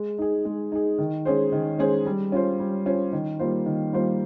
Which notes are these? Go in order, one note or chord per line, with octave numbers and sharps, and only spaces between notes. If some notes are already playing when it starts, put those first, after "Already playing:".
Already playing: G#3
D#4 G#4
G#3
D#4 G#4
D#3
G#3 C#4 G#4 C5
D#3
G#3 C#4 G#4 C5
G3
C#4 F4 C5
G3
C#4 F4 C5
D#3
G3 A#3 F4 C5
D#3
G3 A#3 F4 C5